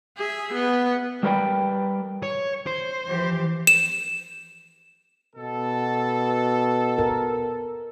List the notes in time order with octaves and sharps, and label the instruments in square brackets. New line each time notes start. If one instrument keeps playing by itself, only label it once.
[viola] G#4 E5
B3
[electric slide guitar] G3 A#4 B4 D5 G5
[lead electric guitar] C#5
C5
[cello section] E3 F3 G4
[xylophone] E7
[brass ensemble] B2 A4
[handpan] A#4